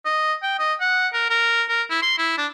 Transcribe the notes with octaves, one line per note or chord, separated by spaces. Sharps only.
D#5
G5
D#5
F#5
A#4
A#4
A#4
E4
C6
E4
D4